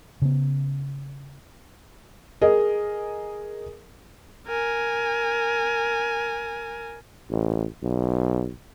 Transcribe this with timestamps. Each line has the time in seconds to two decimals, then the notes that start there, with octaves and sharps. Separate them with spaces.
0.22 C#3 B3
2.41 G#4 A#4 D#5
4.48 A#4 G#5
7.30 A1
7.82 B1